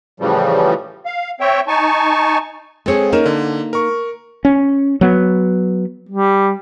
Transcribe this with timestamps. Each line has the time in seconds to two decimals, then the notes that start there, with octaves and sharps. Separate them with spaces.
0.20 A2 C#3 E3 F3 G3
1.06 F5
1.40 C4 C#5 E5 G5
1.68 D#4 G#5 A5 C#6
2.86 G#3 C4 G#4 A4 C#5
3.12 A#3 C#4 D#4 A#4 E7
3.26 D3
3.73 A#4 C#6
4.45 C#4
5.01 F#3 B3
6.09 G3